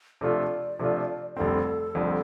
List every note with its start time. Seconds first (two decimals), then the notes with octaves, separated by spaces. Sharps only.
0.21 C3 F3 A3 D4 F4 D5
0.79 C3 F3 A3 D4 F4
1.37 F1 F2 D3 G3 C4 A4
1.95 F1 F2 D3 G3 C4